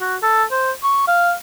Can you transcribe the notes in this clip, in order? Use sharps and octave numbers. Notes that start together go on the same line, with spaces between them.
F#4
A4
C5
C#6
F5